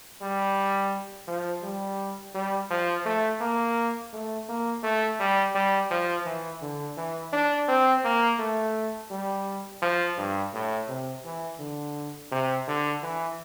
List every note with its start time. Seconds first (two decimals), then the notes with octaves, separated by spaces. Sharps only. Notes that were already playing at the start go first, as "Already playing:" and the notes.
0.22 G3
1.28 F3
1.63 G3
2.35 G3
2.70 F3
3.06 A3
3.41 A#3
4.13 A3
4.49 A#3
4.83 A3
5.20 G3
5.55 G3
5.91 F3
6.26 E3
6.62 D3
6.97 E3
7.33 D4
7.68 C4
8.05 A#3
8.39 A3
9.11 G3
9.82 F3
10.18 G2
10.54 A2
10.88 C3
11.25 E3
11.59 D3
12.32 C3
12.67 D3
13.03 E3